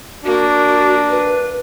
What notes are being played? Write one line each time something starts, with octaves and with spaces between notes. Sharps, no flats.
A#3 D4 F#4
B4